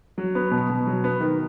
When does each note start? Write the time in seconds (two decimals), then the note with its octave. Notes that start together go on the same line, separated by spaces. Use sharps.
0.18 F#3
0.35 B3
0.51 B2
0.69 B2
0.87 F#3
1.04 B3
1.21 D#3